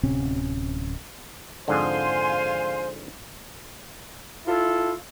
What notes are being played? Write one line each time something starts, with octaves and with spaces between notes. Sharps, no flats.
D1 C3 C4 C#4
F2 G#2 D3 C5 F5 G#5 C6
E4 F4 A4